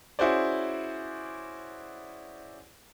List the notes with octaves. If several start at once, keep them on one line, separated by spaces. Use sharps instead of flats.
C#4 E4 F#4 G#4 C5 D5